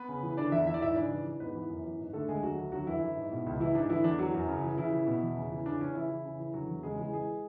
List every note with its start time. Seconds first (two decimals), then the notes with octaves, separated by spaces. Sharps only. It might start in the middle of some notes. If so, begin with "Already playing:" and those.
Already playing: B3 B4
0.09 C#3
0.23 E3
0.37 D3 D4 D5
0.52 E2 E4 E5
0.66 E3 E5
0.74 D5
0.82 G#2 E4 E5
0.96 C#3 D4 D5
1.11 E3
1.26 E3
1.40 G#2 B3 B4
1.55 E3
1.70 F#2
1.85 E3
1.99 G#2
2.13 D3 A3 A4
2.28 D2 G#3 G#4
2.43 D3 F#3 F#4
2.58 D2
2.72 D3 F#3 F#4
2.87 F#2 E3 E4
3.02 E3
3.17 G#2
3.32 B2
3.46 C#2
3.60 E3 E4
3.75 G#2 D4
3.90 D3 E3 E4
4.04 E2 D4
4.19 E3 F#3 F#4
4.34 F#2
4.48 C#3
4.64 E3
4.77 C#3 E3 E4
4.92 E3
5.07 B2
5.23 E2
5.36 C#3
5.51 E3
5.66 C#3 D4
5.80 E3 C#4
5.95 C#3 E3 E4
6.09 E3
6.25 C#3
6.39 E3
6.54 D3 F#3 F#4
6.69 E2
6.83 C#3 G#3 G#4
6.98 E3 G#3 G#4
7.13 E3 G#3 G#4